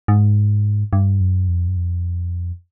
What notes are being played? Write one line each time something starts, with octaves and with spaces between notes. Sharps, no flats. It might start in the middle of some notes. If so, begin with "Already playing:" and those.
G#2
G2
F#2
F2
F#2
F2